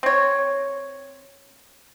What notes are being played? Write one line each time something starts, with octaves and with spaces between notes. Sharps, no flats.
C4 C#5